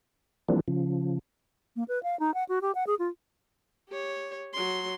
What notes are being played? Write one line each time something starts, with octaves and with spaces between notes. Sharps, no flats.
E3 F3 G3 A#3 C4 D4
C#3 F3
A#3
B4
F5
D#4
F#5
F#4
G4
F#5
G#4
F4
G4 C#5
F#3 C6